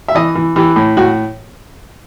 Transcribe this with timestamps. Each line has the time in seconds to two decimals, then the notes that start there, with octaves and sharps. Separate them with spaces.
0.08 E5
0.15 E3 D#5
0.35 E3
0.56 E3 G4
0.76 A2
0.97 A2 F#4